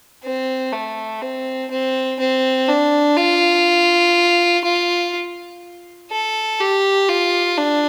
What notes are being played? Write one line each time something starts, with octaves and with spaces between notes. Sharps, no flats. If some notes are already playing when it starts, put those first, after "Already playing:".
C4
A3
C4
C4
C4
D4
F4
F4
A4
G4
F4
D4